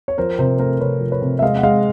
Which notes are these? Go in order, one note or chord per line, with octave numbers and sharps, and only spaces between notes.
C#5
F3 A#4 C5
C3 A#4 C5
A3 A#4 C5
C3 B4 C#5
F3
B4 C#5
C3
E5
G#3 D#5 F5
F#5
G#3 D#5 F5